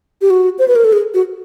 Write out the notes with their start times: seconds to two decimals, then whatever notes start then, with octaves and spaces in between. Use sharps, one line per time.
0.22 G4
0.30 F#4
0.59 C5
0.68 B4
0.76 A#4
0.84 A4
0.93 G#4
1.14 F#4